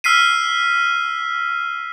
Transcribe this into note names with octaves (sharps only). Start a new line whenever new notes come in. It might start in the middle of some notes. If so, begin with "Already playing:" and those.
E6 F6 B6 C7 D#7